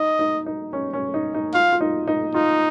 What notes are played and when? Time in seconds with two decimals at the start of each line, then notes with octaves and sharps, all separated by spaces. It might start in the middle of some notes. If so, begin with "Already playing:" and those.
Already playing: D#4 D#5
0.19 D#4
0.46 D#4
0.73 C#4
0.93 C#4
1.14 D#4
1.35 D#4
1.54 F4 F5
1.73 F4
1.81 D#4
2.08 D#4
2.34 D#4 F4